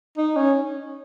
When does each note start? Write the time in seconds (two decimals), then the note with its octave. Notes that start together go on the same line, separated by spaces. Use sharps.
0.17 D#4
0.37 C#4